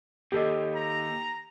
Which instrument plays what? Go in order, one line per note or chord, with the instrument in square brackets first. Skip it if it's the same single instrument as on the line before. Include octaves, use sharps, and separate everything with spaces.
[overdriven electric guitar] D#2 [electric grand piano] G4 A4 D#5
[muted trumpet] A#5